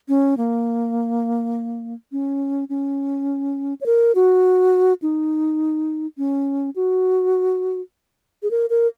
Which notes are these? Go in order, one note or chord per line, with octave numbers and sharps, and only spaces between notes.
C#4
A#3
C#4
C#4
C#5
A#4
F#4
D#4
C#4
F#4
G#4
A#4
A#4